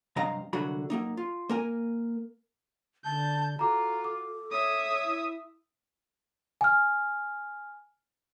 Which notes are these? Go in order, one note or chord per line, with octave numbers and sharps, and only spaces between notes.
G2 C3 F#3 D#5 F5 A#5
C2 D3 F#3 F#4 B5
F#3 A#3 D#4
F4
A#3 A#4 G#5
D3 A5 G6
F4 F#4 A4 A#5 D6
D6
C#5 E5 D#6
E4
G#5 F6